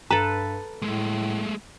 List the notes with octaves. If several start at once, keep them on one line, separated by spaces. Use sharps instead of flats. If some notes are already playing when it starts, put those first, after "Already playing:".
G2 A4 B4 A#5
A2 G#3 A3